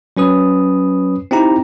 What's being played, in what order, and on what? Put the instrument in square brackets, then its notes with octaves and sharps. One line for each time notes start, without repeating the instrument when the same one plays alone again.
[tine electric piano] F#3 C#4 B4 D#6
C4 D#4 E4 G4 A#5